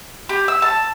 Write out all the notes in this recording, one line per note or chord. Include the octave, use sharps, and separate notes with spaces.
G4
E6
A5